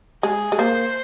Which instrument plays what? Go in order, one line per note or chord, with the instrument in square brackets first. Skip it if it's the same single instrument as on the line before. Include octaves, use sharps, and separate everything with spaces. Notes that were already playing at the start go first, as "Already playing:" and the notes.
[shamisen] G#3 [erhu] G#4
[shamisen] G#3
[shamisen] A#3 [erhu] C5